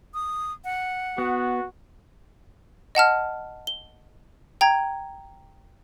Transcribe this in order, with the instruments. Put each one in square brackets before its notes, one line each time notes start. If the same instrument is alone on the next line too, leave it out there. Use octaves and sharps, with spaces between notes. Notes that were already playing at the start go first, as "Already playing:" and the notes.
[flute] D#6
F#5
[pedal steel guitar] B3 [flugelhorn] F#4
[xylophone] D#5 F#5 A5 F6
G7
G5 A#5 G#6